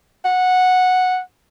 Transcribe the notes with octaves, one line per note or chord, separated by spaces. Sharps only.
F#5